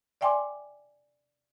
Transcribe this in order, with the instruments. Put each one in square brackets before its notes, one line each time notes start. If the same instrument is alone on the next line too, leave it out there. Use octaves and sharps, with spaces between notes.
[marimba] D5 E5 G5 G#5 C6 D6